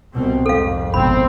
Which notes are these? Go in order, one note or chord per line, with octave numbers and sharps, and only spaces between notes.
C2 B2 C4
C2 F2 G#2 A4 F5
G#1 B2 C4 B5